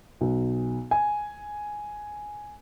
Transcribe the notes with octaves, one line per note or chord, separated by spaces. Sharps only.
B1
G#5